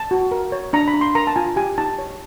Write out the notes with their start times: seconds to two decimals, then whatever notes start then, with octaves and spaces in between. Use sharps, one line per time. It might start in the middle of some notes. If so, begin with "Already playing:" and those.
Already playing: A5
0.11 F#4
0.31 A#4
0.52 C#5
0.73 D4 A#5
0.88 B5
0.94 D4
1.01 C6
1.15 A#4 A#5
1.27 A5
1.36 F4 G#5
1.56 G4 G#5
1.78 D#4 A5
1.99 C#5